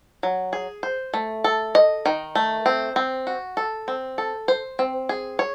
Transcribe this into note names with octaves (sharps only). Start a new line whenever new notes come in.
F#3
G#4
C5
A3
A4
D#5
D#3
A3
C4
C4
F#4
A4
C4
A4
C5
C4
G#4
C#5